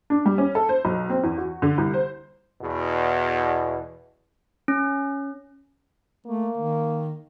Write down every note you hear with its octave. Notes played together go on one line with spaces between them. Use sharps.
D4
G3
C#4
A4
C5
B1
C4
E2
F#4
D3
C2
C5
E2 B2
C#4
A3 A#3
D#3